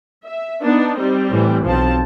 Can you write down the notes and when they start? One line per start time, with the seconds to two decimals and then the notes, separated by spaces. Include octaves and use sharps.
0.24 E5
0.62 B3 D4 D#4
0.98 G3 C4
1.29 A2 E3
1.65 B1 F3 C4 A5